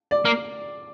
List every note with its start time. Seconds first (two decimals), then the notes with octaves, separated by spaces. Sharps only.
0.11 D5
0.25 A#3